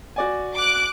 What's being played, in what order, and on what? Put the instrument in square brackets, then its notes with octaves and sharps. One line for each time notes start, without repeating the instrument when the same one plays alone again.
[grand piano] F#4 D5 G#5
[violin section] D6 F#6